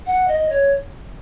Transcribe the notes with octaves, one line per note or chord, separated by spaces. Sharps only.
F#5
D#5
C#5